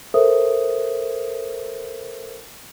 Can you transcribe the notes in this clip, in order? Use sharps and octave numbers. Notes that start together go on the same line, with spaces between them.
A4 A#4 C5 E5 D#6